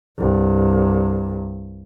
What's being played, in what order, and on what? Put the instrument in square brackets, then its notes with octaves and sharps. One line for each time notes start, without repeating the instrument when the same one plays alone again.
[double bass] C2 G2